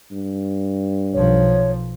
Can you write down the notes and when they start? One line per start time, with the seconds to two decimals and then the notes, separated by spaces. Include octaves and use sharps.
0.12 G2
1.14 B1 F3 C#5